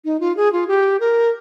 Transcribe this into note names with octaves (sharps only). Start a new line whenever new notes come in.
D#4
F4
G#4
F4
G4
A#4